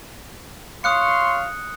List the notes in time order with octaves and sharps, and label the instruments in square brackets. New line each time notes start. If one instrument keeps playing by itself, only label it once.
[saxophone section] F4 C#5 F5 [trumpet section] C6 C#6 [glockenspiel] D#6 F#6 C#7